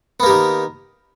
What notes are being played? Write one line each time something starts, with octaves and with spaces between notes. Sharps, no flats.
D#3 A#3 B3 G4